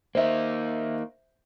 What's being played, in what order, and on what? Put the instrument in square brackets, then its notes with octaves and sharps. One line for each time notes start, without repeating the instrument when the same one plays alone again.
[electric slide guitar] A#3 D#4 [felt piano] C5 E5